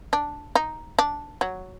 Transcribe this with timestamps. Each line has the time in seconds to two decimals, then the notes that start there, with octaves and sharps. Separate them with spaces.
0.13 D4
0.55 D#4
0.99 D4
1.41 F#3